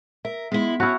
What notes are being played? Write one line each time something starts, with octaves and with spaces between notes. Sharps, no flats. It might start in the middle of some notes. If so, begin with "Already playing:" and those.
A#4 E5
G#3 B3 E4 B6
C#4 E4 F#4 A5 C#6 F6